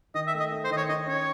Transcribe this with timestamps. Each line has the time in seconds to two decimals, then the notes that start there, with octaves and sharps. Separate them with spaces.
0.14 D#3 D#5
0.27 E5
0.34 A3
0.40 D#5
0.51 A3
0.64 C5
0.70 D#3 D#5
0.77 C#5
0.89 D#3 D#5
1.07 C#4 C#5